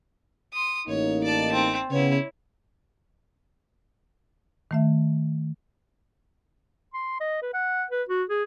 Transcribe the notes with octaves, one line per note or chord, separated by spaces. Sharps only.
C6 D#6
A1 A#3 D#4 C#5
D5 A5
C4
C#3 B3 E4 C#5
D#3 A3 E5
C6
D#5
B4
F#5
B4
F#4
G#4